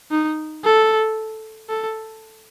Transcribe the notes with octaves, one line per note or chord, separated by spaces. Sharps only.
D#4
A4
A4